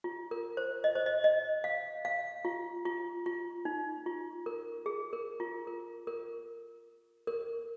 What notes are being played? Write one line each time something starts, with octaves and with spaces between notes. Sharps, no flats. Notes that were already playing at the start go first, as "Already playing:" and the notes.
F4
A#4
C5
D#5
C5
D#5
D#5
F5
F5
F4
F4
F4
D#4
F4
A#4
G#4
A#4
F4
A#4
A#4
A#4